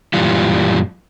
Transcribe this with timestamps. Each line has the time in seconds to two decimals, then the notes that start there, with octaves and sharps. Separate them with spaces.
0.14 F#2 A#2 E3 G3 F4